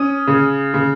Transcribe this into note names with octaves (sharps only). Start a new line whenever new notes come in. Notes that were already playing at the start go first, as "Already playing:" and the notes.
Already playing: C#4 D#6
C#3
C#3